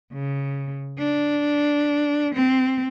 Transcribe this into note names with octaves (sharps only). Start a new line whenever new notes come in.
C#3
D4
C4